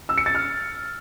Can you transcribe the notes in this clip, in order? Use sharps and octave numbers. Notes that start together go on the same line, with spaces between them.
E6
C#7
A6
F6